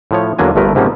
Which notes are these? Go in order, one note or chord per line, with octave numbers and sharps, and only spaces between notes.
A2 F3 C#5
E2 D3 F#3 A#3 D4 G#5
G1 G2 F3 A3 A#4 B4
G#2 C3 F3 A#3 B3 C#4